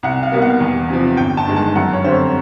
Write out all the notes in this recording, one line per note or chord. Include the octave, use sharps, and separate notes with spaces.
C2 F#5
F5
B2 G3 A#3
F#5
E2
C3 F3
G1 G5
A5
G2 D#3 G#3
A5
F#2 F#5
C#5
D3 G3 C4 C5
C#5